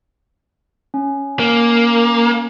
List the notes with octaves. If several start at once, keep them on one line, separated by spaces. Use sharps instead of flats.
C#4
A#3